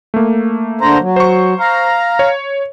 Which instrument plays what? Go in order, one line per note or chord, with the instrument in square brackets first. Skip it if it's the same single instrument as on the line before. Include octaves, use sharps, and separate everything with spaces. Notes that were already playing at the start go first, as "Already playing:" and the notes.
[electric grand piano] A3 A#3
[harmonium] D3 C5 A#5
F#3
[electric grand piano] C5 C#6
[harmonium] F5 A#5
[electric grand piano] C#5